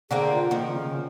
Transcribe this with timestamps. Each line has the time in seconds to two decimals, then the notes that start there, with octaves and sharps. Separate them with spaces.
0.11 D3 A#3 C4 G#4
0.33 F4
0.51 D#3 F3 A#3
0.67 C#3